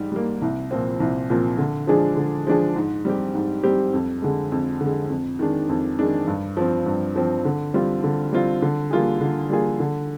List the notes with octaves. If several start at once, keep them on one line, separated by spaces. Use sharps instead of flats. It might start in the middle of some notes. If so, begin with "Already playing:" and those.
Already playing: G#2 G3
G3 A#3
C2
A#2 F3 C4
C2
A#2 F3 C4
D3
F3 G#3 D4 G#4
D3
F3 G#3 D4 G#4
G#2
G3 C4 G4
G#2
G3 C4 G4
F2
D3 G#3
F2
D3 G#3
F2
D#3 G#3 D4
F2
D#3 G#3 D4
G2
F3 C4
G2
F3 C4
D3
G3 C4 F4
D3
G3 C4 F4
D3
G3 A#3 F4 G#4
D3
G3 A#3 F4 G#4
D3